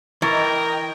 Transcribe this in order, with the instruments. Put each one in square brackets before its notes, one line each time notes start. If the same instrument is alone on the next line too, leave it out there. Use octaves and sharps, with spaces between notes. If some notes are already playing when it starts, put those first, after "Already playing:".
[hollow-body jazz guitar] E3 [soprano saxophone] A#4 [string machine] D#5 G5 [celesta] C#6 G#6 A6